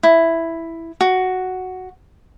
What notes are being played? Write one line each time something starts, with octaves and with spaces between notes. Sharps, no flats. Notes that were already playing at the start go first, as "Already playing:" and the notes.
E4
F#4